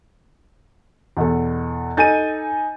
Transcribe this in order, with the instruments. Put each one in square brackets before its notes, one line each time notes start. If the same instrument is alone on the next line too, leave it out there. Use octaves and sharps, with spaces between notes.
[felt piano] E2 B2 A4
[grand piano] D#4 G#5 D#7 [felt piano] A4 G6 A6